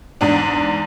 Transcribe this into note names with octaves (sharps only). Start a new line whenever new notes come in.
E2 G#2 D4